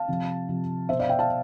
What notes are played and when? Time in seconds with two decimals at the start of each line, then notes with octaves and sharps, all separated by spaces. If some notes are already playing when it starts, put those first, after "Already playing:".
Already playing: F5 A5
0.08 C3 F3
0.49 C3 F3
0.89 B2 C5 E5
0.99 D5 F5
1.09 E5 G5
1.19 F5 A5